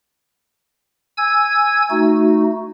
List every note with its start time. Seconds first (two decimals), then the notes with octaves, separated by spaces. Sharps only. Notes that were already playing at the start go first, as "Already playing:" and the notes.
1.18 G#5 E6 G#6
1.90 A3 D#4 F#4